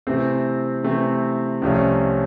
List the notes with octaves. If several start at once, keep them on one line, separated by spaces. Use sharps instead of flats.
C3 E3 A3 C4
C3 E3 A3 C4
C2 C3 F3 A3 C#4